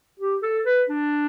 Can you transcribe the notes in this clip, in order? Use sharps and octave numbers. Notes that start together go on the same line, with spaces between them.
G4
A4
B4
D4